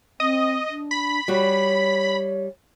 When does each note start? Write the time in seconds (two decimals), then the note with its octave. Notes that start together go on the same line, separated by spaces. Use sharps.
0.20 C4 D#5
0.69 D4
0.91 B5
1.28 G3 F#4 C#5